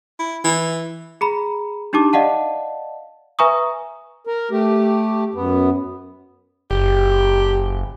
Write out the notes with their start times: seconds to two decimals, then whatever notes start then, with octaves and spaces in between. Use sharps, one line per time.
0.19 E4
0.45 E3
1.21 G#4 A#5 B5
1.93 D4 D#4 G4 A5 D6
2.13 D5 D#5 F5 F#5 A5
3.39 B4 E5 G#5 A#5 C#6 D#6
4.27 A#4
4.51 A3 G4
5.34 F#2 B3
6.71 F#1 G4